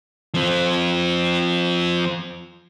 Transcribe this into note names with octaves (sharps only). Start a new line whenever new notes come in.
F3 C4